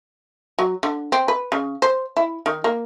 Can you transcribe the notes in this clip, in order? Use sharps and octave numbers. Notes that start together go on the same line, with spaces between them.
F#3
D3
C4
B4
C#3
C5
E4
D#3
A#3